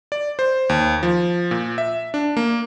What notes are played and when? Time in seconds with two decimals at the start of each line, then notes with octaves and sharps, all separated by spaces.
0.12 D5
0.39 C5
0.69 D#2
1.03 F3
1.51 A#2
1.78 E5
2.14 D4
2.37 A#3